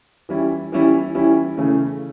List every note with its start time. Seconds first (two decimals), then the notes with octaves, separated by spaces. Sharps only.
0.29 E3 G3 C#4 E4
0.72 E3 G3 C#4 E4
1.15 E3 G3 C#4 E4
1.57 C#3 E3 A3 C#4